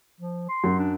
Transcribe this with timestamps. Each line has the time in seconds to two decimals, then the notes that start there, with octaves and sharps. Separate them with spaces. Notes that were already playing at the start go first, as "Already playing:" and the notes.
0.20 F3
0.49 C6
0.64 F#2
0.78 D4